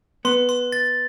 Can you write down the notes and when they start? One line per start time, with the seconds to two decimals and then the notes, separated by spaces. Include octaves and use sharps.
0.25 B3 C6
0.49 C6
0.72 A6